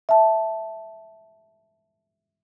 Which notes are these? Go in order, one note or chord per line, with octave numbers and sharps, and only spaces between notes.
E5 A5